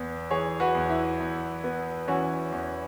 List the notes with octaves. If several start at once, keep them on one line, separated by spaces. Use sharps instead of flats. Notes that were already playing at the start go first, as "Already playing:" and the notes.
Already playing: E2 B3
E3 G#4 C#5
F#4 B4
E2
E4
E2
B3
E3 C#4 F#4
E2